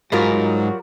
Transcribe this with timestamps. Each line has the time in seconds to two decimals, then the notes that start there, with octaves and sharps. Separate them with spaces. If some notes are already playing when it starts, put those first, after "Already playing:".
0.12 G#2 F#3 G3 F4 F#4 A#4